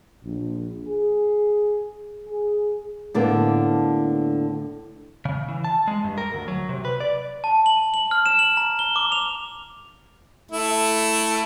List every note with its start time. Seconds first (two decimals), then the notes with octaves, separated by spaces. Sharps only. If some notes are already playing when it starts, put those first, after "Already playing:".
0.23 A#1
0.87 G#4
2.27 G#4
3.14 A2 D3 A#3 B3
5.25 C#3
5.49 E3
5.65 A5
5.88 G#3
6.04 G2
6.18 A#4
6.34 D2
6.48 F#3
6.69 C3
6.85 B4
7.00 D5
7.44 A5
7.66 F#7
7.94 F#7
8.11 F6
8.26 E7
8.39 F#7
8.57 A#5
8.79 G7
8.96 D6
9.12 F7
10.51 A3 E4